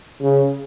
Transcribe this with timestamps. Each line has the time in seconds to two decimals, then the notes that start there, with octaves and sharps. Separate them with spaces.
0.22 C#3